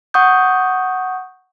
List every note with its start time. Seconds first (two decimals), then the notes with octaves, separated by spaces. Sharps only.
0.14 F#5 C#6 D#6 G6